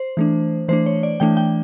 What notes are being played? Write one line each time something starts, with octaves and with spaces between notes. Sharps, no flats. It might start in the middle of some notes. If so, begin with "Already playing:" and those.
Already playing: C5
E3 A3 D4
E3 A3 D4 C5
C#5
D5
E3 A3 D4 G5
G5